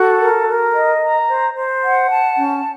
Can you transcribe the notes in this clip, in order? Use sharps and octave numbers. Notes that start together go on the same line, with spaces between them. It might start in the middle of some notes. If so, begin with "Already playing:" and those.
Already playing: F#4 A4
A#4
A#4
D#5
A#5
C5
C5
F#5
A5
C#4